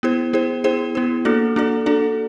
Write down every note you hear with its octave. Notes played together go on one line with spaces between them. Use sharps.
B3 E4 G#4 C5
B3 E4 G#4 C5
B3 E4 G#4 C5
B3 E4 G#4 C5
A#3 D4 F#4 A4 D5
A#3 D4 F#4 A4 D5
A#3 D4 F#4 A4 D5